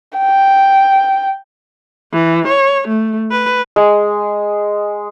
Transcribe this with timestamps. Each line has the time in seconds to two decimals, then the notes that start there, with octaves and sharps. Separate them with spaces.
0.19 G5
2.13 E3
2.48 C#5
2.88 A3
3.31 B4
3.76 G#3